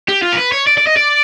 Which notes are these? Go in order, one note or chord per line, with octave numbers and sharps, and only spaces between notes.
G4
F4
A#4
B4
C#5
D5
D5
D#5
D5